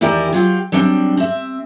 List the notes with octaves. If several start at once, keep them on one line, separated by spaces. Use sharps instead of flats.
E2 D#3 E4 G4 A#4 D5
F#3 F4 G4
F#3 G3 C4 D4 G5
C4 E5